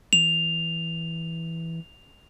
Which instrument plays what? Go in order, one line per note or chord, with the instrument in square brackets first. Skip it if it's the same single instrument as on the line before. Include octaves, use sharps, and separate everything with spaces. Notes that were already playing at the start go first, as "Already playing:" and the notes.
[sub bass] E3 [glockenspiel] F7